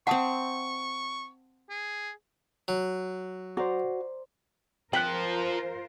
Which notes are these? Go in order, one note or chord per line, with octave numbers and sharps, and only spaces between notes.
C4 E5 F#5 A5 C#6 D#6
G#4
F#3
F#4 C5 D5 A#5
F3 C4 F4 A#4 C5 F#6 B6 F#7